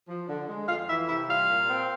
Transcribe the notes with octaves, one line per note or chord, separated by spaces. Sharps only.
F3
D3
G#3
F2 F4 F5
E3 E4 E5
C3 E4 E5
G3 F4 F5
A#2
C4